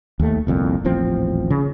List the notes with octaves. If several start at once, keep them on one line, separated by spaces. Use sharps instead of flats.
D#2 A3
G1 C2 F2 A#2
D#1 A1 F3 C4
C#3